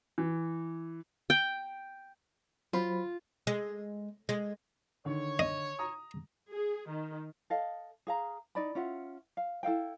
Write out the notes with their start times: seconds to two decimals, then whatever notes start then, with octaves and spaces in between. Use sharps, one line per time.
0.18 E3
1.30 G5
2.73 F#3 F4 C5 B5
3.47 G#3
4.29 G#3
5.05 D3 D#3 C#5
5.39 D#5
5.79 A#5 D#6
6.51 G#4
6.90 D#3
7.50 A4 D#5 F5
8.07 G#4 F5 A#5
8.55 D#4 D5 B5
8.75 C#4 F4 E5 F#5
9.37 F5
9.63 E4 A4 F5 G5